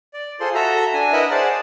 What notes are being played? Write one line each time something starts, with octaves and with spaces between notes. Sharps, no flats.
D5
F4 G#4 A4 C5 C6
F#4 A4 E5 A#5
D4 G#5
E4 A#4 B4 D#5 E5 F#5
G#4 C5 D5 F#5 A5